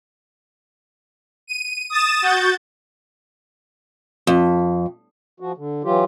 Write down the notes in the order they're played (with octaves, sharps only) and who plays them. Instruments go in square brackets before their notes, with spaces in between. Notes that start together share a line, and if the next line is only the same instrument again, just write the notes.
[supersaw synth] D#7
D#6 A6 E7
F#4 G6 A6
[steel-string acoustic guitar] F2
[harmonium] F3 F#4
D3
E3 F#3 F4 G4